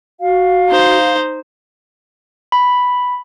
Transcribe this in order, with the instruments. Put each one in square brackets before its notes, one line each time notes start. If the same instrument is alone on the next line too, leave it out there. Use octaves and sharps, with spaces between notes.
[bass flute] F#4 [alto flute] F5
[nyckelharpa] D#4 C5
[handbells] B5